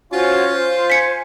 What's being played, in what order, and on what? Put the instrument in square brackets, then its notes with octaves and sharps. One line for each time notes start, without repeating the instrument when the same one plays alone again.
[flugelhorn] C#4 [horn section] F4 [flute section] F#4 C5 C#5
[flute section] C5
[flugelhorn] G#5 [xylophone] B6 C#7